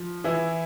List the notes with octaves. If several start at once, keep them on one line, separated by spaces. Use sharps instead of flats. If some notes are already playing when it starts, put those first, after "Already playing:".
Already playing: F3
E3 E4